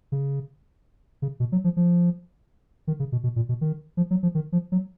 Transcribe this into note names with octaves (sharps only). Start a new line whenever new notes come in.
C#3
C#3
B2
F#3
F3
F3
D#3
C#3
B2
B2
A#2
B2
D#3
F3
F#3
F3
D#3
F3
F#3